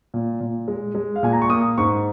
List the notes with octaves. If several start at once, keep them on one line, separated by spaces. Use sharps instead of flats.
A#2
A#2
G#3
G#3
F5
A#2 G#5
A#5
C#6
A#3 D#6
G#2 C#6